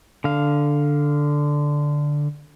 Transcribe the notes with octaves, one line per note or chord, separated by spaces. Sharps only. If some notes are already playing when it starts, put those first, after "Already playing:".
D3 F5